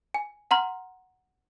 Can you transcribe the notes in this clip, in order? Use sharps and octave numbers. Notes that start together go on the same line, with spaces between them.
G#5
F#5 A#5 C6 F6